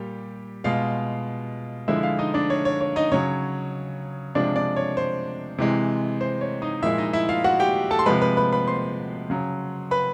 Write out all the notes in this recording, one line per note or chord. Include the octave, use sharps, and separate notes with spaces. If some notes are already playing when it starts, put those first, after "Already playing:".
Already playing: A#2 G3 G4
B2 G#3 F4 F5
D3 F3 G#3 E4 E5
F4 F5
D#4 D#5
D4 D5
C#5
C#5
C#5
D#4 D#5
C#3 F#3 C#5
C3 F3 G#3 D4 D5
D4 D5
C#5
C5
C3 E3 G#3
C5
C#5
D#4 D#5
A#2 F3 G#3 E4 E5
D#4 D#5
E4 E5
F4 F5
F#4 F#5
G4 G5
A4 A5
C6
C3 F3 G#3 B4 B5
B4 B5
B4 B5
B4 B5
C5 C6
C#3 F#3
B4 B5